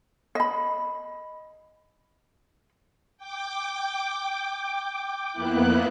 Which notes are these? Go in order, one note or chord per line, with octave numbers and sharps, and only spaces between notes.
D#5 B5
G5 D6
F2 A#3 B3 E4 F#6